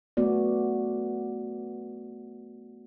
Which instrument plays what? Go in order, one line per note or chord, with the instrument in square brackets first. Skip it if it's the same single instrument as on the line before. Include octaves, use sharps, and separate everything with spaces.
[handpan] A3 B3 F#4 D5